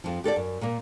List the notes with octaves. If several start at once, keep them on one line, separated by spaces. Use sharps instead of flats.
F2 F3
G4 A4 A#4 D5
F#2
A#2 A#3